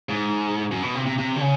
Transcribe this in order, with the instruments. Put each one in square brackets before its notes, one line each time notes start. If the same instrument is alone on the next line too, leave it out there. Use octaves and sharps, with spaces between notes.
[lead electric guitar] G#2
F#2
B2
C3
C3
C3
D3
C#3